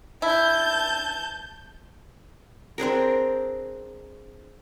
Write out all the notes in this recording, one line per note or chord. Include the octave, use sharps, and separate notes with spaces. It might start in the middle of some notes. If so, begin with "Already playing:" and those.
E4 A5 G6
C4 D4 G#4 A#4